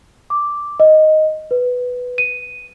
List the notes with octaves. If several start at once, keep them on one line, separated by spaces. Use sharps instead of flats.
D6
D#5
B4
D#7